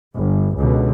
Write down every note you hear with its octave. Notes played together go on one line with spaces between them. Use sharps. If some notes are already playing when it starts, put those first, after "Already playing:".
G1
C#2 B2 D3